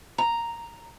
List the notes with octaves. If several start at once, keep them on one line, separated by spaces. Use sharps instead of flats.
A#5